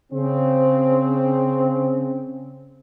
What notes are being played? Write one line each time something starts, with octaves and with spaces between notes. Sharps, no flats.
C#3 C4